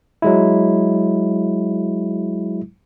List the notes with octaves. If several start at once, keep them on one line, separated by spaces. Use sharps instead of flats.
F#3 G#3 E4